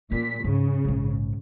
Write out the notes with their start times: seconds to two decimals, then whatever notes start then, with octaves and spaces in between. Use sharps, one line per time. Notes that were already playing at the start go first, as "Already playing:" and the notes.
0.11 A#2 C#4 D4 B6
0.44 G#2 C#3 C#4
0.85 A#1 G#2